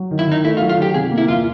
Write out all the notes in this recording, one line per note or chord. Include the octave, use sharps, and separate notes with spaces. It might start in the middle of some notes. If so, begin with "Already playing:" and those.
Already playing: F#3
D#3
E4
D#3 D#4
A3 E4
F4
F#3
F4
D#3 G4
C3 G#4
A#3
E4
E2 F4